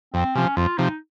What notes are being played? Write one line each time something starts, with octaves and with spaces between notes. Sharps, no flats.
F2 C4
C3 F3 C#4
F2 F4
C3 F3 D#4